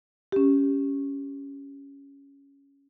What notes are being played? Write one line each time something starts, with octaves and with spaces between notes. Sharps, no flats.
C#4 G4